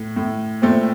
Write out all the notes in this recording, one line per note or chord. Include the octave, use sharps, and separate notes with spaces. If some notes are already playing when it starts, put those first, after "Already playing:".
Already playing: A2
A2
A#2 A3 C4